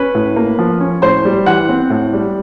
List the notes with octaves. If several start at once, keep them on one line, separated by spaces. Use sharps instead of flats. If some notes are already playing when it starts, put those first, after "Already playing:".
Already playing: C#4 B4 B5
A2
A#3
F3
C#4
A2 C5 C6
G3
E3 F#5 F#6
C4
A2
G3